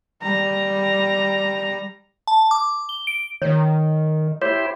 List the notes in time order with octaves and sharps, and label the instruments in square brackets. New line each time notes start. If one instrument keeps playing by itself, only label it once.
[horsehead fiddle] G3 A#5
[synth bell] A5
D6
G7
D7
[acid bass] D#3 [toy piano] C#5
[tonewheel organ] E4 G4 C5 [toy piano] C#5